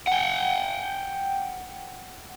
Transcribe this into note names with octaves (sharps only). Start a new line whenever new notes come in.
F#5 G5